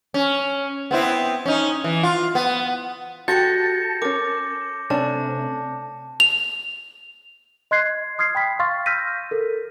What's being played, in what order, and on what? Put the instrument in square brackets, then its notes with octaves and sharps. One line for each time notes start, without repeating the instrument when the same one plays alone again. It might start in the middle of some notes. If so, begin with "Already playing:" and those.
[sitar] C#4
B3 C4 E4
C#4 D#4
E3
F4
B3
[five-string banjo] F#4 G4 [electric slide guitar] A4 [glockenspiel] G6 A#6 C#7
[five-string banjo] C#4 A#4 [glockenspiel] D6
[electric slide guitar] C3 [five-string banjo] A3 C#4 D4 [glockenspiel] A5
[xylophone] F7
[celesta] D#5 C6 F#6 G#6 C7
C6 D#6 F6 G#6 C7
G5 B5 B6
F5 C6 C#6 F6 A6
E6 F6 G6 A#6 B6 D#7
A4 A#4